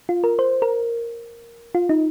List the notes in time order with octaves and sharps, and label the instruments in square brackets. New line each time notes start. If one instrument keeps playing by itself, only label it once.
[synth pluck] F4
A#4
C5
A#4
F4
D#4